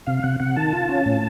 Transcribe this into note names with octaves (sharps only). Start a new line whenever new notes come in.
C3 F5
C3 F#5
C3 F#5
D#3 A5
F4
C#4
A2